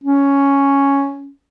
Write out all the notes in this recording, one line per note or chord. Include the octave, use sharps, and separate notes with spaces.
C#4